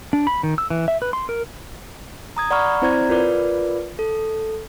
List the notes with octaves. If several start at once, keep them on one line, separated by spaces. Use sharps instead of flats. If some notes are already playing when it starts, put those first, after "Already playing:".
D4
B5
D#3
E6
E3
E5
B4
C6
A#4
A#5 D#6 G#6
D5 F#5 A#5 B5 C#6 F6
C4 E4 C5 D5 A#5 G#6
F4 A#4 B4 D5
A4